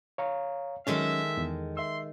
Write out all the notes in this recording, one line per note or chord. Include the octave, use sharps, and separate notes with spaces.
C#5 F5 A#5
D#3 F#3 G#3 C#4 A4 E5
E2
E5 C6 E6